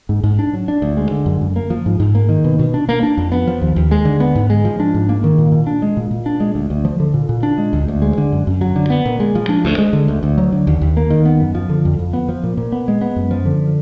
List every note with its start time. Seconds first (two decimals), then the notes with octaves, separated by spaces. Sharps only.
0.09 G#2
0.24 G#2
0.39 D4
0.53 F#3
0.68 D4
0.82 D2
0.97 G#3
1.11 D3
1.26 F#2
1.41 F#2
1.56 A#3
1.70 F3
1.86 G#2
2.00 G#2
2.15 A#3
2.29 D#3
2.44 B2
2.59 B2
2.74 D4
2.89 A#3
3.03 D4
3.17 F2
3.32 B3
3.47 F3
3.61 D#2
3.76 D#2
3.91 G#3
4.05 D3
4.20 B3
4.35 G#2
4.50 G#3
4.65 F3
4.80 D4
4.94 G#2
5.09 A#3
5.24 D#3
5.38 A#2
5.52 A#2
5.67 D4
5.82 G#3
5.97 A#2
6.11 A#2
6.26 D4
6.40 G#3
6.55 D2
6.70 D2
6.85 F3
7.00 D3
7.14 A#2
7.29 A#2
7.43 D4
7.58 G#3
7.73 D2
7.88 D2
8.02 G#3
8.18 D3
8.32 F#2
8.47 F#2
8.61 F#3
8.76 D3
8.90 B3
9.05 A#2
9.20 G#3
9.35 F3
9.49 D4
9.65 D2
9.78 G#3
9.93 D3
10.08 D2
10.23 D2
10.38 F#3
10.52 D3
10.67 D#2
10.81 D#2
10.97 A#3
11.10 D#3
11.25 B3
11.40 F#2
11.55 F3
11.69 D3
11.85 F2
11.99 F2
12.13 B3
12.29 F3
12.43 A#2
12.57 A#2
12.72 B3
12.88 G#3
13.01 B3
13.16 F#2
13.31 F3
13.46 D3